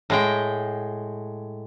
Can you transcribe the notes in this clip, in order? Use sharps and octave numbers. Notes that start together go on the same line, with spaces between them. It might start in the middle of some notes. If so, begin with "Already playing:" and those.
A2 G#3 G5